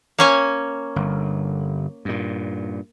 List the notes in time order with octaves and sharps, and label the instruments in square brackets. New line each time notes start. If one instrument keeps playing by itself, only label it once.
[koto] A#3 C#4 G#5
[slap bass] G1
G2 A#2